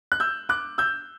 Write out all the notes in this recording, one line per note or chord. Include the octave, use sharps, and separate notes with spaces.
F#6
E6 G6
D6 F#6
E6 G6